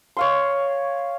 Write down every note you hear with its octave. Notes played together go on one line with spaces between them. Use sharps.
C#5 F5 C6